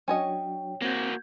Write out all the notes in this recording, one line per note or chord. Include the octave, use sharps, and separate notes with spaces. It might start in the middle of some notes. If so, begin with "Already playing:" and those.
F#3 C#4 D4 F#4 C#5 D#5 G5
A#3 C4 F#4 G6 G#6